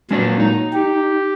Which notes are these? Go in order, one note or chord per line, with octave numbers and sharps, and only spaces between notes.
A#2 F#3 G#3 D4 D5
D#4
G4